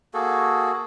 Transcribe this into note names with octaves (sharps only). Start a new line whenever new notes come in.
A#3 F#4 G#4 A4